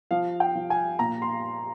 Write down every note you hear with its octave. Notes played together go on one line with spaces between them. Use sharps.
F3 F5
G5
F3
G#5
A#2 A#5
C6